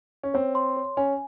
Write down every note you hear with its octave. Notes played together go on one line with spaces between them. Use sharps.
C#4
C4 C#5
C6
C#5
C#4 G#5